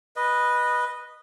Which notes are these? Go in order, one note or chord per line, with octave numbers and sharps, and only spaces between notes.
B4 D#5